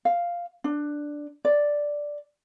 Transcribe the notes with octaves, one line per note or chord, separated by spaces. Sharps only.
F5
D4
D5